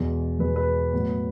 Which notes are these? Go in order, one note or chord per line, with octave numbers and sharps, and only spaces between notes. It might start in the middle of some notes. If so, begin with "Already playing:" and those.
Already playing: E2 B2 G#3
E2 B2 G#3 B4
B4
A2 F#3 B3